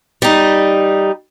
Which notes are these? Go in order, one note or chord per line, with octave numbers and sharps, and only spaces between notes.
G3 D#4